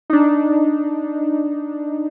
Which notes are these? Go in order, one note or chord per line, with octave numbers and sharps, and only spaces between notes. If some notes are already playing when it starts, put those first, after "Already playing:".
D4 D#4